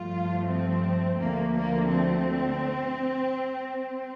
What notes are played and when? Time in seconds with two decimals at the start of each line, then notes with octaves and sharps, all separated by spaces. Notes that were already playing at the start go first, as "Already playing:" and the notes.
Already playing: G2 F3 A3 F4
0.50 C4
1.20 D2 D3 F3 A3 A#3
1.55 A#3
1.90 C4